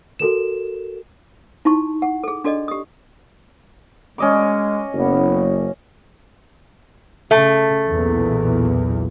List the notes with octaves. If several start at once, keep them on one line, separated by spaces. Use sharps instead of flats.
F#4 A4 A#4 E7
D#4 E4 F#4 A5 C#6
F#5
G#4 A4
D4 F#4 A4 D5 D#5
G4 D#6
G#3 C#4 D#5 D6
F#1 B3
C#3 A3
B1 E2 A#2